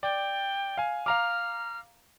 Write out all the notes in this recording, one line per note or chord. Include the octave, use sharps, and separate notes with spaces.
D5 G5
F5 G#5
F5 A#5 D6 F6